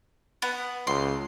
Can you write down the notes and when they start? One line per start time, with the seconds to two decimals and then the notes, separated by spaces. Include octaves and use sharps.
0.42 B3 F#5
0.87 C#2 C6